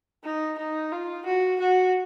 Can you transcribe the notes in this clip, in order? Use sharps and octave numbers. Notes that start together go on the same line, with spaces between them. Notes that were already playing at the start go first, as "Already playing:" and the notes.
D#4
D#4
F4
F#4
F#4